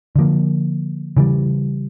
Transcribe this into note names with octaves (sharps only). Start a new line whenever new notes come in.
D3 F3 A#3
C#3 E3 G3